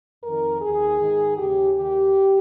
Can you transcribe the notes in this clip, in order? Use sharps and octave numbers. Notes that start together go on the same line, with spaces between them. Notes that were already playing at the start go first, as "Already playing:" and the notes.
F2 D#3 A#4
D#2 D#3 G#4
G#2 D#3
D#2 C#3 G4
D#2 D#3 G4